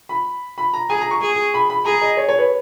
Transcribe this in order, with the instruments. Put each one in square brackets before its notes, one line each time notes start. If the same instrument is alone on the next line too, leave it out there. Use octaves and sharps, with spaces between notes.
[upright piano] B5
B5
A#5
[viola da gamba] G#4 [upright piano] G#5
[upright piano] A#5
C#6
[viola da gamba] G#4
[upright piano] B5
B5
[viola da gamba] G#4 [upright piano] A#5
[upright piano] D#5
C#5
C#5
B4